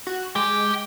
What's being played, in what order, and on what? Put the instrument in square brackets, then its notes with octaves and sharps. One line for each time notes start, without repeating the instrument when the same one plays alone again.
[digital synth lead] F#4
[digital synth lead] G#3 [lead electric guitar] G4